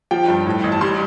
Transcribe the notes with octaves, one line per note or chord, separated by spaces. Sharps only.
F3 G5
G2
A2
A1
A5
G3 C6